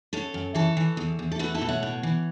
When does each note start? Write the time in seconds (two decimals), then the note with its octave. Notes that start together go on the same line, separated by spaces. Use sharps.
0.13 F#2 A4 C#5
0.34 F#2
0.55 E3 A4 C#5
0.77 E3
0.97 E2
1.19 E2
1.32 A4
1.39 A3 F#4 B4
1.54 E4 A4
1.61 B2
1.69 C#5 F#5
1.83 A2
2.03 E3